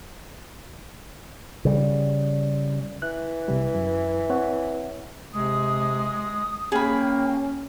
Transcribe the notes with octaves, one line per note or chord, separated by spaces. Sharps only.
C#3 G3
E3 F#6
C2 C3 G3
F#2
C4 C#5 F#5
C3 G#3 D#6
A#3 C#4 G#4 G5 B5